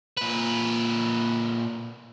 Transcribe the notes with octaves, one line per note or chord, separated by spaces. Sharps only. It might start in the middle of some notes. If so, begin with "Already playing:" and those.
A#2 B4